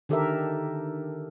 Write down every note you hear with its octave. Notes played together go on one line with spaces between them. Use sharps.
D3 D#3 G4 A4 A#4 E5